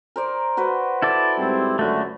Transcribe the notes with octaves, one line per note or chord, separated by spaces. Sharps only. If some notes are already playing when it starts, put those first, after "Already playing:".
A#4 C5 D5
F#4 B4 C5
E4 A4 D5
G#2 G3 C4
C#2 F#2 D3 A3 F#4